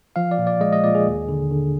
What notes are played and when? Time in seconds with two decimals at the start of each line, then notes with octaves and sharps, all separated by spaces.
0.16 F3 F5
0.31 D5
0.38 A#2
0.47 D5
0.61 G#3 D#5
0.73 D#5
0.83 A#2 D5
0.95 G#4
1.06 D#2
1.29 D3
1.51 D3